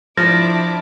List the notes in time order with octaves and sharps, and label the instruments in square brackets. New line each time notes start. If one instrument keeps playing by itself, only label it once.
[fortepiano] F3 [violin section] D4 E4 D6 [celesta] A#6